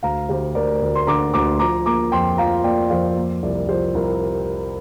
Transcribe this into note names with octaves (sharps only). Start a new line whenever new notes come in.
D2 F5 A#5
D2 G4 C5
D2 A#4 D5
D2
C6
D3 A#5 D6
D2 A#5 D6
F3 A#5 D6
A#3 A#5 D6
F2 G5 C6
F3 F5 A#5
A#3 D5 G5
F2 C5 F5
A#3
C2 A#4 D5
F3 G4 C5
C2 F4 A#4